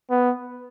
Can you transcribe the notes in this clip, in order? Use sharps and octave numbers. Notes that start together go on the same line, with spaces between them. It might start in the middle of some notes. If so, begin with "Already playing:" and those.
B3